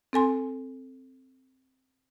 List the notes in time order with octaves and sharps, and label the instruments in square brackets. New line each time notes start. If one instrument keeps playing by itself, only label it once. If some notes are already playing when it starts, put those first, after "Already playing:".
[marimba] C4 A4 G#5 C6